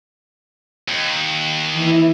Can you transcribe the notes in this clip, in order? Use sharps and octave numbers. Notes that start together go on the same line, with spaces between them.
D#2
E3 E4